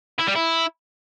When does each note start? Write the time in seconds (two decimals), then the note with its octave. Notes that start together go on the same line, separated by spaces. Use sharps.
0.20 E4
0.28 G3
0.36 E4